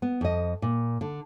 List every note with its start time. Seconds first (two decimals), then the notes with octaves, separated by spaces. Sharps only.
0.02 B3
0.21 F2 D#5
0.62 A#2
1.01 D3